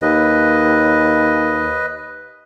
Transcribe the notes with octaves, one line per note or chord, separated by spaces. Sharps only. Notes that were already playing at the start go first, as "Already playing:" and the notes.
D#2 B4 D#5